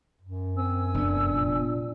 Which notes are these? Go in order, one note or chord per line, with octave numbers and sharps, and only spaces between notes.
F#2
C4 G#5 E6
F1 B3 D4
A#2